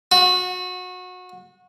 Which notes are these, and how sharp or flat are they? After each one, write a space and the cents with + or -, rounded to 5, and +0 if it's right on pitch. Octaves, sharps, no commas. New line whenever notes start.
F#4 -25